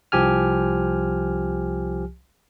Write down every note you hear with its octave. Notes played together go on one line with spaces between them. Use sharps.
C2 F3 G4 G#5 F6